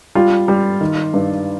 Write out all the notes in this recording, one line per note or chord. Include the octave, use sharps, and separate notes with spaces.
G3 F4
G3
D#3
G2